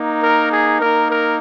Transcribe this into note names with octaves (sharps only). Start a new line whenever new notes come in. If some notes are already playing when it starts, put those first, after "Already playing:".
Already playing: A#3 D#4
A#4
G#4
A#3 D#4 A#4
A#4